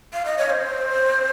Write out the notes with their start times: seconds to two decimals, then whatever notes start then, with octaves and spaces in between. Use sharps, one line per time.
0.13 F5
0.25 D#5
0.38 C#5
0.50 C5